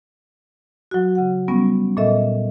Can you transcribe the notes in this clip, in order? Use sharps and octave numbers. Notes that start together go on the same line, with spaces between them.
F#3 F#4
C#3 F#5
G3 B3 C#4
A#2 A4 D#5 E5